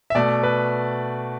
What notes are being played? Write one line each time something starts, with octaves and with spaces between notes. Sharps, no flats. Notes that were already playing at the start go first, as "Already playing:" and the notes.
E5
B2 A3 D5
B4